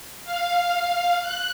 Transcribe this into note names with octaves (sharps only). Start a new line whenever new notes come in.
F5
F#6